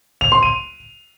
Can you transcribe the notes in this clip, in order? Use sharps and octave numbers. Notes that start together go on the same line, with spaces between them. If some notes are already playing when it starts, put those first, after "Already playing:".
F7
C6
D#7